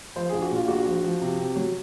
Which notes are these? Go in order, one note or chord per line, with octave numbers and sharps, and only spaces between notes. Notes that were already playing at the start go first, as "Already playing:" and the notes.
F3 C5
A#1 G#4
F#4
A#2 F4
A#1 F#4
F3
F3
C3
C3
F#3